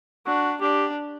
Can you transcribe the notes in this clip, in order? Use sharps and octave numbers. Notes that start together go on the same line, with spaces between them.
D4 F#4
D4 G4